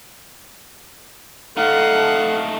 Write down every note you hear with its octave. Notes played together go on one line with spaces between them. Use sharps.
A3 D#4 A4 F5 F#5